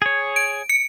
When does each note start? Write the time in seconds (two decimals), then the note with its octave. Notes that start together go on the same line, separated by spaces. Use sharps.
0.02 G#4 C#5
0.36 D7
0.69 C#7